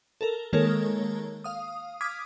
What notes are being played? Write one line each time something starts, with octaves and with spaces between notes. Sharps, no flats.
A4 A#4
D#3 G#3 A#3 A4 A#4 C#5
F5 D#6
D6 D#6 F6 G#6 B6